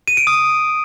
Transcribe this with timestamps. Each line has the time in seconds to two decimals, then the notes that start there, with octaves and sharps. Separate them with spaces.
0.08 D#7
0.17 D7
0.27 D#6